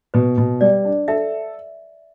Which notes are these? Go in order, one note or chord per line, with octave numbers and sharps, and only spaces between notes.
B2 B4
B2
G3 D5
D4
A4 E5